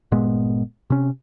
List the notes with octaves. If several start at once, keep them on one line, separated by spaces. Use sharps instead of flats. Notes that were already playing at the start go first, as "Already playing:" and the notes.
G1 A#2 G#3 B3
C3 C#4